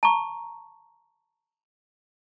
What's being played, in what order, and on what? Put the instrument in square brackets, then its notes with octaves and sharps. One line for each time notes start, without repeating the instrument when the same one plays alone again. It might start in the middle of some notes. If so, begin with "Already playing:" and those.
[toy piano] A5 A#5 C#6